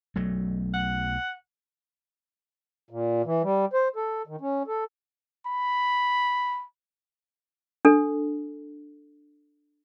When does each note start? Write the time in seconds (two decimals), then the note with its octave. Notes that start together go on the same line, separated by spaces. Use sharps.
0.15 B1 F#3 A3
0.74 F#5
2.90 A#2
3.25 E3
3.43 G3
3.73 C5
3.96 A4
4.27 D#3
4.41 C#4
4.67 A4
5.46 B5
7.85 D4 A4